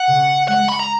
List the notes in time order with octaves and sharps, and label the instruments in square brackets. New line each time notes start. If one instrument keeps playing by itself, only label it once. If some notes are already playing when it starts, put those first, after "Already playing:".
Already playing: [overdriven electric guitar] F#5
[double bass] C#3
[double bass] G#3 [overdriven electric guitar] F#5
[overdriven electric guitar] B5
A#5